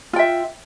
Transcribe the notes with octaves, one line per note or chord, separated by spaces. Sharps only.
F4 E5 G5